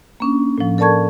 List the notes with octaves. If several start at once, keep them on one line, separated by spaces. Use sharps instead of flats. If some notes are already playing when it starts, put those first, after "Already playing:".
A#3 C#4 D4
A2 F3
A4 A#4 D5 A5 C#6 G#6